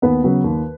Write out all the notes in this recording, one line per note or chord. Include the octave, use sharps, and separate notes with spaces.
D#2 B3 B4
C#3 F#3 B3
D#2